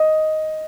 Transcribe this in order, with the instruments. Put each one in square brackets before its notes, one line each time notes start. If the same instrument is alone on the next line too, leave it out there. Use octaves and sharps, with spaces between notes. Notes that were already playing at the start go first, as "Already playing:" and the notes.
Already playing: [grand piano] D#5